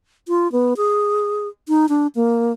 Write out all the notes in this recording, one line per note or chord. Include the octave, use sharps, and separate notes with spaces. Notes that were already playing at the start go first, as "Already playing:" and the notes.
F4
B3
G#4
D#4
D4
A#3